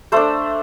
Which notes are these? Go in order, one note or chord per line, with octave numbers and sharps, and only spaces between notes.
A3 D4 C5